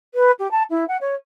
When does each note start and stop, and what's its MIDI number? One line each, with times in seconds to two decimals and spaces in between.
0.14 0.31 71
0.38 0.49 67
0.51 0.62 81
0.70 0.84 64
0.88 0.97 78
1.00 1.14 73